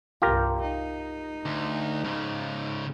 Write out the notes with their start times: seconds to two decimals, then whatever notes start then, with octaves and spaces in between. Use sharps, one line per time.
0.22 C2 G2 F4 G4 A#4
0.61 D#4
1.46 D2
2.04 G#2 C#3